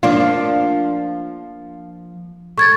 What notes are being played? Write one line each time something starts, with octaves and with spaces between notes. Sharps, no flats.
F3 A#3 D4 F4
A3 C#6 G#6 A6